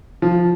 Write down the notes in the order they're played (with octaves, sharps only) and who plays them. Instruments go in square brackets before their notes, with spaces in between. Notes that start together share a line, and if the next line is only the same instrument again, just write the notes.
[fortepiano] F3